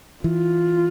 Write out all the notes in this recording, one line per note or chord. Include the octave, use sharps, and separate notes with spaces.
E3 F4